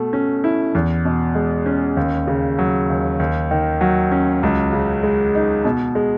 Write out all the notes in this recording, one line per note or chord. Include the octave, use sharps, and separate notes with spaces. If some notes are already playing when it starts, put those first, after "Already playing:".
Already playing: B2 A3
C#4
E4
E2
B2
G#3
C#4
D#2
C#3
F#3
D#2
D#2
D#3
F#3
C#4
C#2
C#3
G#3
D#4
B2
G#3